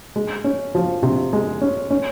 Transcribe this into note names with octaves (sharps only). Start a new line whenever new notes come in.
G#3
C#4
F3
C3
G#3
C#4
C#4